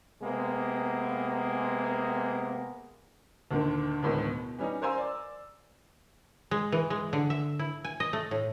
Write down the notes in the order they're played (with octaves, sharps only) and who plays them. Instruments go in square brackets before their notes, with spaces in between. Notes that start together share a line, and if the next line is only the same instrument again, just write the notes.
[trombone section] C3 G#3 A#3 B3
[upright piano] D2 A#2 D3 D#3
D2 A2 D#3 G#3 B3
B2
E3 G3 C#4 D#4
A#4 C5 F5 G#5 C6 E6
D5
[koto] G#3
E3
G#3
D3
E5
E4
G#5
D#5
A3
A2